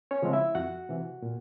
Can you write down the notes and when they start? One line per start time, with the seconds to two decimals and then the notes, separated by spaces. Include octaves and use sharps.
0.11 C#4 C#5
0.22 C#3 F3 G#3 C4
0.33 E4 E5
0.55 F2 F#4 F#5
0.89 C3 E3
1.22 A#2